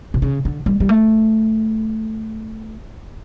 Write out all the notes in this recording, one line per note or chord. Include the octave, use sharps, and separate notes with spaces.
B2
C#3
D3
G3
G3
A3